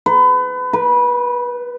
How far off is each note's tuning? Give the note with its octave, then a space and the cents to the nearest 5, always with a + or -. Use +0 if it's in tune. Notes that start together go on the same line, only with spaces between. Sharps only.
B4 +30
B4 -25